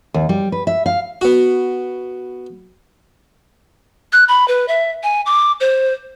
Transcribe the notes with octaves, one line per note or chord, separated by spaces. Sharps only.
D#2
G3
B4
E5
F5
B3 F#4
F#6
B5
B4
E5
G#5
D6
C5